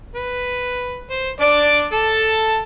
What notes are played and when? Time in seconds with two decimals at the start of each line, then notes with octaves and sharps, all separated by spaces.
0.15 B4
1.10 C5
1.40 D4 D5 D6
1.92 A4 A5